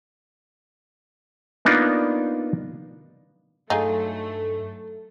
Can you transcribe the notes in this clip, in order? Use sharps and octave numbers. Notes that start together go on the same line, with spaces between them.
A#3 B3 D4 D#4 F4 D5
G2 F#3 A3 D#4 F4 G#4